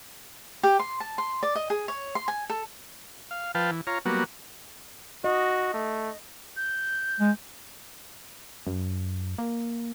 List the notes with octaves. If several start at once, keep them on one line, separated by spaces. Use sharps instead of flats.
G4
C6
A5
C6
D5
D#5
G#4
C#5
C6
G#5
A4
F5
F3 B4 F5 G5 A5
E3
F4 C#5 A#5
F#3 G3 A#3 B3 F#4
F#4 D#5
A3
G6
G#3
F#2
A#3